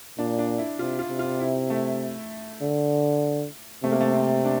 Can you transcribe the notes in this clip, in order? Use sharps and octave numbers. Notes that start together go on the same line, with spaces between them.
A#2 D4
D4
E4
C3 F4
F4
C3
F4
E4
A3
D3
C3 A3
A#3
A3
C4
D4